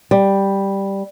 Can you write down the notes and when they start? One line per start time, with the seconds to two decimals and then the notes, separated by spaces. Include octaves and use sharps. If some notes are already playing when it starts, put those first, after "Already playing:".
0.11 G3